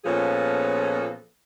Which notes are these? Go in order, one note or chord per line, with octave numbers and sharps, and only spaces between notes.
A#2 F3 B3 C#4 G#4 A4